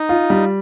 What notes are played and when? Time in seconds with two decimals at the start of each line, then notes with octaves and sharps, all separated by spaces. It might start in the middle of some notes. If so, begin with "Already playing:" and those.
Already playing: D#4
0.09 F4
0.30 G3